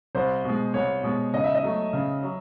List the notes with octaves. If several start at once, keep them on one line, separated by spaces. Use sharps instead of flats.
C2 C5
B2 G#3
C2 C#5
B2 G#3
C#3 D#5
E5
D#5
F#3 A3
C#3
F#3